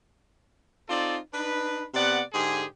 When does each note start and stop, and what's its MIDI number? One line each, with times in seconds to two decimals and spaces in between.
0.88 1.17 60
0.88 1.17 63
0.88 1.17 65
0.88 1.17 69
0.88 1.17 74
1.33 1.85 62
1.33 1.85 63
1.33 1.85 71
1.94 2.21 48
1.94 2.21 59
1.94 2.21 74
1.94 2.21 78
2.33 2.64 44
2.33 2.64 50
2.33 2.64 67
2.33 2.64 68